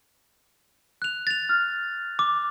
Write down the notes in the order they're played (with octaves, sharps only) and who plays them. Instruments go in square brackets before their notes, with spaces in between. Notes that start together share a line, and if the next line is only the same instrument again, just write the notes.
[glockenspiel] F#6 F7
A6 F7
[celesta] F6
[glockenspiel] D6